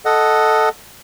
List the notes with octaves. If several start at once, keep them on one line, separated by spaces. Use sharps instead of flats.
A4 D#5 F#5